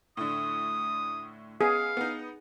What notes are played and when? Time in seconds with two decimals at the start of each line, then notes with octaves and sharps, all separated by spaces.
0.17 A2 D3 D#6
1.61 B3 G#4 F5
1.97 B3 D#4